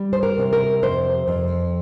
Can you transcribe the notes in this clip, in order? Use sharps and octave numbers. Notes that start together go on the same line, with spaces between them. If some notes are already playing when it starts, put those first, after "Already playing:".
Already playing: G3
C5
A#4
C3
A#4
F2 C5
F2